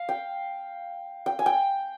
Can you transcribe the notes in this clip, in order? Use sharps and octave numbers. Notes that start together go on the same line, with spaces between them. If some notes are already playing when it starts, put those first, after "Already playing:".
Already playing: F5
G5
G5
G#5
G5